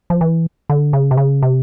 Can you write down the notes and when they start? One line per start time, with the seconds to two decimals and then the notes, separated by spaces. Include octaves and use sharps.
0.10 F3
0.21 E3
0.70 D3
0.93 C#3
1.11 C3
1.17 C#3
1.43 C3